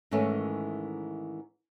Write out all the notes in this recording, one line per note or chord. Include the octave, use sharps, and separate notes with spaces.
G#2 D#3 E3 A3 C#4